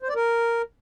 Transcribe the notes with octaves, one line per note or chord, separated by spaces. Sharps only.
C5
D5
A#4